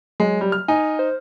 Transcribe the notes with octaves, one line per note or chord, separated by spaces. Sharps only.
F#3 G#3
G3
F6
D#4 G#5
C5